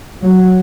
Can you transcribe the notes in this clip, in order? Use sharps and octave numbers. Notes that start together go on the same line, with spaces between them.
F#3